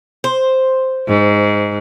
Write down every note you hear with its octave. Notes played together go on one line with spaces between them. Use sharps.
C5
G#2